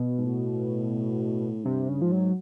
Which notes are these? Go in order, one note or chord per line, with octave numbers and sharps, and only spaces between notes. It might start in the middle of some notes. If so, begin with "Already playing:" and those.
Already playing: B2
G#2
A2
G2 C3
C#3
G#2 F3
F#3